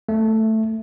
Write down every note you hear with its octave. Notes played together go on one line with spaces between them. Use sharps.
A3